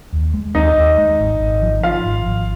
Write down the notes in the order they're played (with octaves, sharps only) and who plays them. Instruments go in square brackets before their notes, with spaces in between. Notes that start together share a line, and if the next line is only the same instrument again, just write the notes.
[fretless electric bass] D#2
G#3
[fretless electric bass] D#2 [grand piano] D#4 D#5
[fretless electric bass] D#2
G#3
G#1
G#1
F3
[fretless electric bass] F3 [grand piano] F4 F5
[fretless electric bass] G#1
G#1